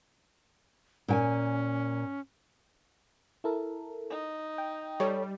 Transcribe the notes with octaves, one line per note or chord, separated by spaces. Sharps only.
A#2 C#4 G5 G#5
E4 A4 A#4
D#4
G5
G3 A4 C#5